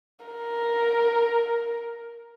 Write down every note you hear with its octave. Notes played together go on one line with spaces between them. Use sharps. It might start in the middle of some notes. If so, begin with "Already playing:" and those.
A#4